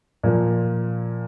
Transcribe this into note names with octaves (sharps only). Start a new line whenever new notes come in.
A#2 F3 A#3